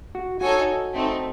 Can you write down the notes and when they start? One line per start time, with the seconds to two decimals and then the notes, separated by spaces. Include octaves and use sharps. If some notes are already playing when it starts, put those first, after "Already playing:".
0.15 F#4
0.41 D#4 F#4 A4 C#5 G#5
0.94 A3 C4 D#4